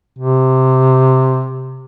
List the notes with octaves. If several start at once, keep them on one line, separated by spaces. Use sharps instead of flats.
C3